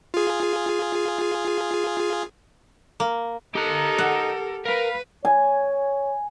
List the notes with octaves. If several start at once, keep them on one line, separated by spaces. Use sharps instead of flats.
F4 G#4
A#3
D#4 G4 A4 A#4 A#5
F#5
A#4 B4 F5
C#5 G#5